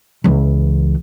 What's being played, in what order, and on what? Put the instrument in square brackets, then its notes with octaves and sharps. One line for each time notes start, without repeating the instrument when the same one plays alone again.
[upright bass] C#2 E3